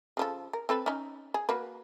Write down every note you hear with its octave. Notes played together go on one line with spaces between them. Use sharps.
C#3 F3 A4
A#4
C4 A4 B4
C#4 D#4
G#4
A#3 F#4 B4